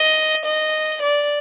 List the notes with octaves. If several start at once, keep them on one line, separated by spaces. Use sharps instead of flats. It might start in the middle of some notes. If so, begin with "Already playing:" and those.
Already playing: D#5
D#5
D5